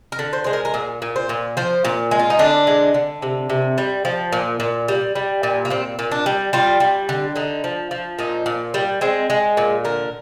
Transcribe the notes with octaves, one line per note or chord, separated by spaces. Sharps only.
A#4
D3
C5
G#3 C5
A#4
A#4
A#2 G#4
A#2
C5
A#2
F3 C5
A#2
G#3
F4
D#4
D3 D4
G#3
D3
C3
C3
G3
F3
A#2
A#2
G3
G3
A#2
A#3
A#2 C4
A#2
D4
G3
G3 F4
G3
D3
D3 D#4
F3
F3
A#2 D#4
A#2
G3
G#3 C4
G#3
A#2
D3 A#4